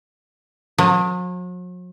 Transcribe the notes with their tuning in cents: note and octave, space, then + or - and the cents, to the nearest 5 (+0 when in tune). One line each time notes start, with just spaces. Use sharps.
F#3 -45